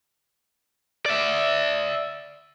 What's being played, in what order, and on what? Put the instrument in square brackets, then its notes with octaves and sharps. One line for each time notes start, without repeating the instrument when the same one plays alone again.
[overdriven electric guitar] D5 E5